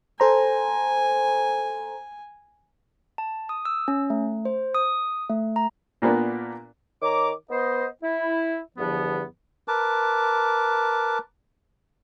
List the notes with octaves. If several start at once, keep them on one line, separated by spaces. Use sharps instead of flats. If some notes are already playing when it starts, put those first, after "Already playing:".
A4 C5 G#5 A#5
A5
D#6
E6
C#4
A3
C5
D#6
A3
A#5
A#2 A#3 B3 D4
D#3 C#5 A#5 D6
B3 C5 D#5
E4
E2 G2 D3 F3 B3
A#4 B4 A5 D6